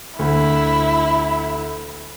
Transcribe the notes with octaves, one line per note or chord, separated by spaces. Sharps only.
D2 E4